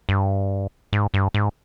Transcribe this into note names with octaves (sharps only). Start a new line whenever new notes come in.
G2
G#2
G2
G#2